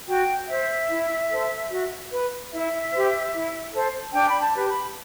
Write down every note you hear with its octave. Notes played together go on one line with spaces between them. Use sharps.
F#4 G5
C5 E5
E4
A4 C5
F#4
B4
E4 E5
G4 C5
E4
A4 C5
D4 G5
B5
A5
G4 B4
B5